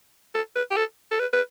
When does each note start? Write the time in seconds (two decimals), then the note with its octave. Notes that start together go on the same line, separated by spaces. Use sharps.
0.35 A4
0.56 B4
0.71 G4
0.77 A4
1.11 A4
1.20 B4
1.33 B4